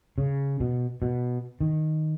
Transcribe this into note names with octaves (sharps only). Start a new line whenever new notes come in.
C#3
B2
B2
D#3